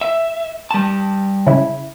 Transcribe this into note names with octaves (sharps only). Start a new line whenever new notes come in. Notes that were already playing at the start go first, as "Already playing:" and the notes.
E5
G3 A5
C#3 E4